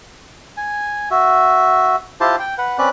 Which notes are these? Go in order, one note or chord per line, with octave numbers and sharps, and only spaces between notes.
G#5
F#4 E5
E4 F4 G4 C5 A5
G5
B4 F#5
C4 C#4 B4 D5 F#6